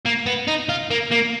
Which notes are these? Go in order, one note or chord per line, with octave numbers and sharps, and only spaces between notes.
A#3
B3
D#4
F4
A#3
A#3